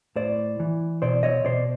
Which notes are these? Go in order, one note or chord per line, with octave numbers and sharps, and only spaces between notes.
A2 C5 D5
E3
B2 C5 D5
C#5 D#5
B2 C5 D5